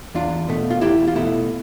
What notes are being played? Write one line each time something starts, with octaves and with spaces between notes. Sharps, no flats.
E2 D4 F4
B2 A3
F4
E2 E4 G4
F4
B2 A3 E4